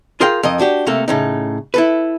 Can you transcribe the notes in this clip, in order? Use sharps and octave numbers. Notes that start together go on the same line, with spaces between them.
F4 G#4 A#4 F5 G5
F2 A#4 D#5
D4 F#4 G4
C3 A3 A#3 A4
A2 C#3 D#4
E4 A4 B4